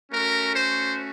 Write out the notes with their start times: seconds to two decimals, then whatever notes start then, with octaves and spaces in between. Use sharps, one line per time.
0.11 A3 C#4 F#4 A#4
0.55 C5